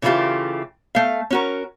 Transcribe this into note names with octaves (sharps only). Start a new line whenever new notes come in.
C#3 E3 A3 E4 F4 G4
A3 F5
C#4 F#4 A#4